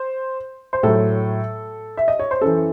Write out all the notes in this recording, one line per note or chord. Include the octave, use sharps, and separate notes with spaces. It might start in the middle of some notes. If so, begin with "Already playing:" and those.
Already playing: C5
C5
A2 F#3 A4
E5
D#5
C#5
C5
F#2 E3 A4